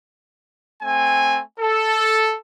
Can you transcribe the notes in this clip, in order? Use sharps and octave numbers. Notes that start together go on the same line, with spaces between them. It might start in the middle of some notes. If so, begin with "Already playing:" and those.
A3 C4 G#5
A4